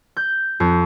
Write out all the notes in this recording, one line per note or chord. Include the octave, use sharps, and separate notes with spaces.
G6
F2